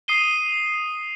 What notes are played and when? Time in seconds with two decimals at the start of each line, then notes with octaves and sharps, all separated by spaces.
0.08 D#6 C7 D#7 G7